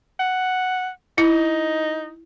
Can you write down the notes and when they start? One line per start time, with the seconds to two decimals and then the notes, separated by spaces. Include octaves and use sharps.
0.20 F#5
1.18 D#4 E4